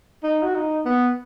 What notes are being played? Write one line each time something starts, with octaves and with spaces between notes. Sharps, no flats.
D#4
F#4
D#4
B3